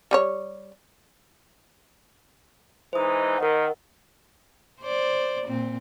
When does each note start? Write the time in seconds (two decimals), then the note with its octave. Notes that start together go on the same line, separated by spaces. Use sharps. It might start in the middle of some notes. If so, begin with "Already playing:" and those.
0.11 G3 G#4 C#5
2.93 E3 G#3 D#4 C5 D#6
3.38 D#3 A#4 D#5 F#5
4.81 C5 D5
5.47 A#2 C4